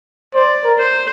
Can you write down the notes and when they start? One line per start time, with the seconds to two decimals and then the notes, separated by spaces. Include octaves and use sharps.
0.35 C5 D5
0.65 A#4
0.79 C5